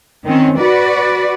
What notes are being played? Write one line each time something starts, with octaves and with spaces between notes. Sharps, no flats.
D#3 C4 C#4
F#4 B4 D5